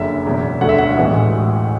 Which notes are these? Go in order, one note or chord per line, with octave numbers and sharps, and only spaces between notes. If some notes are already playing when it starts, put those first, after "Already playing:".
Already playing: F#1 F#2 D3 E5
E1 E2 B2 F#3
E1 D2 D3 F#3 A3 F#5
E5
F#5
A1 A2 E3 G#3